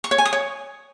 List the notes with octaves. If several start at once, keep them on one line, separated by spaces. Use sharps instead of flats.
C#6
C#5
G#5
D#6
C#5